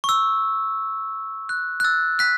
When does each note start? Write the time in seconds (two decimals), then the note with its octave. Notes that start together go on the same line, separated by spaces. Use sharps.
0.04 C#6
0.09 E6
1.49 F#6
1.80 F#6
1.84 E6 A6
2.19 F#6 B6